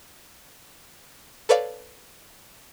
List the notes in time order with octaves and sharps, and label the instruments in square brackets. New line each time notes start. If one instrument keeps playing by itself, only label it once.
[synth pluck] A4 B4 C#5 D5 F5